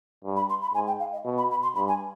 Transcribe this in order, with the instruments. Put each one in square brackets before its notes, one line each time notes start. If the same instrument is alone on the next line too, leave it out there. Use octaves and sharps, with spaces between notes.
[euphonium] G2
[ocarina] B5
C6
B5
[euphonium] G#2 [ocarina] G#5
[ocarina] G5
F5
D#5
[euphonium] B2
[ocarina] B5
B5
C6
[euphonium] G2 [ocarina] B5
[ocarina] G#5